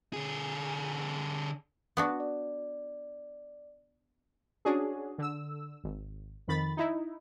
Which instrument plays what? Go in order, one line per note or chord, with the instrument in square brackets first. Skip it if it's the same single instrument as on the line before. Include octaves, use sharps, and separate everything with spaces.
[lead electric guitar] D3 G#4
[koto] B3 D4 F#4
[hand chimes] D5
[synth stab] C#4 D4 F#4 G#4
D3 E6
G#1
F2 D#3 B5 A6
D#4 E4